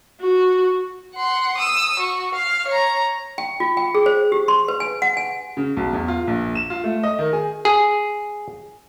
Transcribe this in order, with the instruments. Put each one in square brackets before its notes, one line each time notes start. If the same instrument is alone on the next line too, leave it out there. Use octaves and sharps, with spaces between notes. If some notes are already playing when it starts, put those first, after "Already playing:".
[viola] F#4
[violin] F#5 C6
D#6 E6
F#4
F5
C#5 A#5
[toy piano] G5
F4
G5
G#4
C5
G4
C6
B4
G#5
F#5
G#5
[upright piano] C#3
B1
E2
F4
A#1
E7
F4
A3
D#5
D#3
G#4
[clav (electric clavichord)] G#4